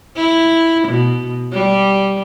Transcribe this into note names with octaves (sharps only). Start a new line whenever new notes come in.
E4
B2
G3